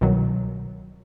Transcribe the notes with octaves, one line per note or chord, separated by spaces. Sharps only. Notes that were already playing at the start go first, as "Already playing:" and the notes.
C2 B2 D#3 F#3